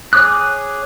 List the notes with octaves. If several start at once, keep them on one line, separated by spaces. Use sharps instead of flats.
G#4 C#5 D6 D#6 F#6